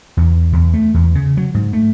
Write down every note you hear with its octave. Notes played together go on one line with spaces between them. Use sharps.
E2
E2
A3
E2
C#3
F#3
G#2
A3